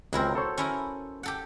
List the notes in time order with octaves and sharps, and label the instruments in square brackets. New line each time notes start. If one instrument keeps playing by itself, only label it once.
[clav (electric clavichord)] C#2 C4 [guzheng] F#3 E4 A#4
[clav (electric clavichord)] A4 C5 C#5
[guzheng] C#4 E4 A#4
G4 A4 F#5